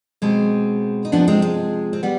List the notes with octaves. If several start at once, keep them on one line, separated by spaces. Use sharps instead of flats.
B2 G#3 C4
D#4
C3 F3 B3 D4
G#3 C4
G#3
C4
G3 B3